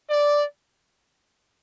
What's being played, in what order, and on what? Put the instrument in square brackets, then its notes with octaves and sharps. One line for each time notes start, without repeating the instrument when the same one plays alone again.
[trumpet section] D5